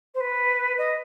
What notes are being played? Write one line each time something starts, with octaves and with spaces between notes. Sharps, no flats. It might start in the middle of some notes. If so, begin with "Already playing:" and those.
C5
B4
D#5